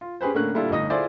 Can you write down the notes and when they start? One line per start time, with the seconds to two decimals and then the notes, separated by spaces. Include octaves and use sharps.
0.01 F4
0.21 C#4 G4 G#4 B4 C5
0.34 A2 D3 A#3 C#4 F#6
0.54 A#2 D3 G3 E4 F4 A4
0.70 G1 A2 D#4 D#6 A#6
0.90 E4 F4 G#4 A4 C5 D5